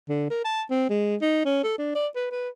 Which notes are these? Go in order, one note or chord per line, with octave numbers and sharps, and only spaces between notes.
D3
A#4
A5
C4
G#3
D#4
C#4
A4
D4
D5
B4
B4